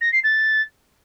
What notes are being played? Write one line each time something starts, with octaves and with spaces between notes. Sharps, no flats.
A#6
C7
A6